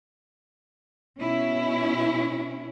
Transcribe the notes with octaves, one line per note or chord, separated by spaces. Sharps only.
B2 C#4 E4